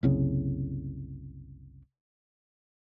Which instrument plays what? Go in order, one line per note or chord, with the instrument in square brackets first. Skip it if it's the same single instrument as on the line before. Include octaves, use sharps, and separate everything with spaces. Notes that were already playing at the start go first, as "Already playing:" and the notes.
[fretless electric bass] F#1 C2 C#3